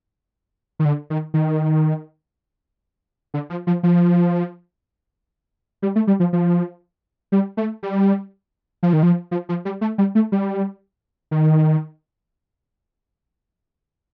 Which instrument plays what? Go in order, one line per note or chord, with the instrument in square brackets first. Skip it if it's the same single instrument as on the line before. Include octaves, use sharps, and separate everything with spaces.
[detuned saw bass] D#3
D3
D#3
D#3
D3
F3
F3
F3
G3
A3
G3
F3
F3
G3
A3
G3
F3
D#3
F3
F3
F3
G3
A3
G3
A3
G3
D#3